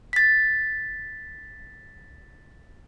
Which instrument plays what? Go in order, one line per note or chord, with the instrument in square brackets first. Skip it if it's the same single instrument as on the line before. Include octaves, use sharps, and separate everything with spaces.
[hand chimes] A6 B6